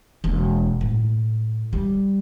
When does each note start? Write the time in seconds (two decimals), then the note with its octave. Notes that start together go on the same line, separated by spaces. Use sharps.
0.24 E1 A#3
0.81 A2
1.73 G3